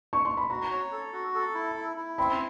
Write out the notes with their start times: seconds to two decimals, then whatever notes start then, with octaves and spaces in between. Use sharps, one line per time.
0.13 C#6
0.25 C6
0.37 B5
0.50 F#4 A#5
0.71 C#5
0.92 A4
1.13 F#4
1.34 A4
1.55 E4
1.76 E4
1.97 E4
2.18 C4 B5